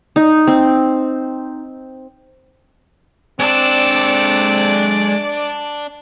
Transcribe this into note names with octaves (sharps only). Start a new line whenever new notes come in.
D#4
C4
G#3 C4 D4 A4 D5